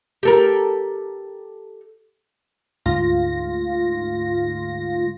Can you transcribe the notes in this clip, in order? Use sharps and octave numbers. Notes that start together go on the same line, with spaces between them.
G4 A4 A#4
D2 G#2 F4 A#6